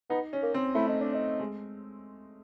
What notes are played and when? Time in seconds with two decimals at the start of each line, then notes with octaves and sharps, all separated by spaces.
0.10 B3 D#4
0.33 C#4
0.42 A#3
0.54 C4
0.75 A3 E4
0.88 D#4
1.01 D4
1.15 D#4
1.40 G#3